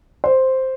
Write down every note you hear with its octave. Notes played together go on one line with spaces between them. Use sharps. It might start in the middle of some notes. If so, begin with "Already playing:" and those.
C5